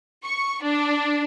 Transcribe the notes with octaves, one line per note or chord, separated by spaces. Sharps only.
C#6
D4